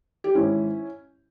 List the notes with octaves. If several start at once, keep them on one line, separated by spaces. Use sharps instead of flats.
G4
G#2 D#3 C#4 E4